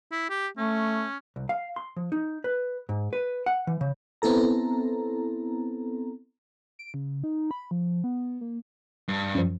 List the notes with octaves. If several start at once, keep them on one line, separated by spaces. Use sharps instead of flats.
E4
G4
A3 C#4
C2
F5
C6
F3
D#4
B4
G#2
B4
F#5
E3
C#3
B3 C4 E4 A4 A#5
D7
C#3
D#4
B5
F3
B3
A#3
G2
F#2 F3